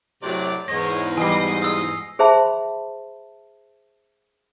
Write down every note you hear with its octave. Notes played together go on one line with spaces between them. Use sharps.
F#2 A2 C3 F#3 D5
E2 G#2 C#5 D#5 A#6
E3 G3 D#5 G#5 C7
D#4 F4 D#5 D#6 E6
G#4 C5 E5 A5 B5 C6